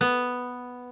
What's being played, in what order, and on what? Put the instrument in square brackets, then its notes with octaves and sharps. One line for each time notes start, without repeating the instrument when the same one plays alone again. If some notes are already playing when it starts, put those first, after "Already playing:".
[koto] B3